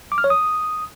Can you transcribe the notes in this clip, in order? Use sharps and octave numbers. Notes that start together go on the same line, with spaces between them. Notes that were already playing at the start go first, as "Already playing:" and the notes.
D6
F6
C#5
D#6